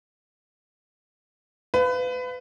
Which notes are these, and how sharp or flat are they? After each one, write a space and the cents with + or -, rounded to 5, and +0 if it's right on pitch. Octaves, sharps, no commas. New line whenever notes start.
B4 +25 F5 +0